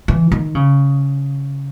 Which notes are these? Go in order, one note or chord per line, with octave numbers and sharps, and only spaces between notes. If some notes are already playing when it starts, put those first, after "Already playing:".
E3
D#3
C#3